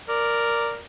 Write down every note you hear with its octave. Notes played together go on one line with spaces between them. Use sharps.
A#4 D5